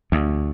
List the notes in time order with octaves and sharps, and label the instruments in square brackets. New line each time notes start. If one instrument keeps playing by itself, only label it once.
[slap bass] D2